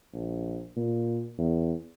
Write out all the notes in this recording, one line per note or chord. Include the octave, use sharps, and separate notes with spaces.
A#1
A#2
E2